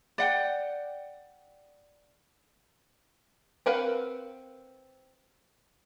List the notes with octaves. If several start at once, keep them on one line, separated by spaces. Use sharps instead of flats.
D5 F#5 G5
C4 A#4 B4 F5 F#5